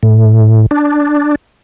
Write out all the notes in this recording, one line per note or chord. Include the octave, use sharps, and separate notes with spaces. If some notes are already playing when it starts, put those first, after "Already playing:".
A2
D4